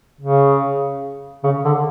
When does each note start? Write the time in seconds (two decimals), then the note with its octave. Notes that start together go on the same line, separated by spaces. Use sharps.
0.21 C#3
1.43 C#3
1.64 D3